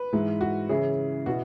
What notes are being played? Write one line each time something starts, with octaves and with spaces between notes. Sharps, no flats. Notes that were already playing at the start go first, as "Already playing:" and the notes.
Already playing: B4
G#2 E3 G#3 E4
F#4
C#3 E3 C#4 E4 G#4
B2 B3 E4 F#4